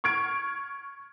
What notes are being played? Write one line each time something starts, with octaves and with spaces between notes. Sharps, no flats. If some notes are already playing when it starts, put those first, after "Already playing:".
C#6 F6 G#6 D7